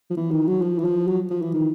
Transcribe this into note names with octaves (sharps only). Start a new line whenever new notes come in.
F3
E3
D#3
F#3
F3
E3
F3
F#3
F3
E3
D#3